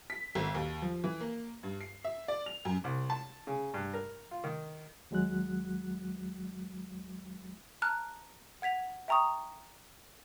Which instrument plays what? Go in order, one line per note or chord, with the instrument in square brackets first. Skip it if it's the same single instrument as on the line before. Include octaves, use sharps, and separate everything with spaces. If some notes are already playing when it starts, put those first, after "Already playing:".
[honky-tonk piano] B6
G#1
D#2
F3
E3
A#3
G2
C7
E5
D5
F7
F#2
[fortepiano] C2
A5
C#3
G2
A#4
F4
D#3
[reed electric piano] D#2 F#3 G#3 F#4 F#6
[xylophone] A5 A#5 F6 F#6
F#5 G#6 B6 F7
E5 G5 A#5 C#6 D#6